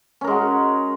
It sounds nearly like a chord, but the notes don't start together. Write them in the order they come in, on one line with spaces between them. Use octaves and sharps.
C#4 A#4 G#3 F#4